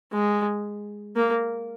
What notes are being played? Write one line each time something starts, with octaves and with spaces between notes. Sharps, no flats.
G#3
A#3